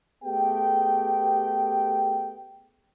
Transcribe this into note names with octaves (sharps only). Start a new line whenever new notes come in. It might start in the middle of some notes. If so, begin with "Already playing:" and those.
A3 B3 G4 G#4 G5